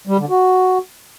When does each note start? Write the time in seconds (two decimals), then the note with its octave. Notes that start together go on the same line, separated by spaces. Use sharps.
0.07 G3
0.18 D3
0.29 F#4